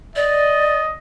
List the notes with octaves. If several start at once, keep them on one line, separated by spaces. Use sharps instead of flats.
D5 D#5